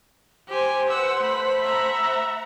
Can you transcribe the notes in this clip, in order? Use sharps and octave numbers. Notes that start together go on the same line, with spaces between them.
G4 C5 G#5
B4 F#5 E6
A3 B5
E5 F#5 A#5